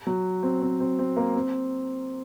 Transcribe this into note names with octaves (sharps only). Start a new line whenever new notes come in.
F#3
C4
C4
C4
C4
A#3
C4